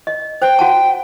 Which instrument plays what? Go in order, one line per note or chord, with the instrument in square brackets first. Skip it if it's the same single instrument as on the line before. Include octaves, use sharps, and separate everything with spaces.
[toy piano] D#5
[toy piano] C5 [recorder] G5
[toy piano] F#4 F#5 A5